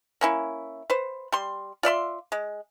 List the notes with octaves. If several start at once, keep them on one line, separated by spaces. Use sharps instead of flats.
A#3 C#4 E4
B4 C5
G3 C6
F4 D5 E5 C6
G#3